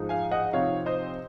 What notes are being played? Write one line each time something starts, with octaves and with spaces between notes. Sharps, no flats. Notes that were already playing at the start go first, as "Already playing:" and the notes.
Already playing: G#2 F3 G#3 D#4
F5 G#5
D#5 F#5
C3 F3 C4 D#4 C#5 F5
C5 D#5